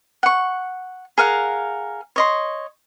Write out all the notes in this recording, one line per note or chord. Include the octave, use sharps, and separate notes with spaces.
F#5 C#6
G#4 A#4 F5 F#5
C#5 D#5 C6